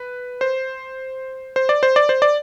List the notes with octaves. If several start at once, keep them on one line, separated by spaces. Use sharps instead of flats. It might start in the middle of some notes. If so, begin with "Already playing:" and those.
Already playing: B4
C5
C5
D5
C5
D5
C5
D5